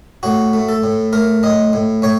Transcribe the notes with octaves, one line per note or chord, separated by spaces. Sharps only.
A2 F#4
A3
A4
A2
A3 A#4
A2 D#5
A2
A2 C#5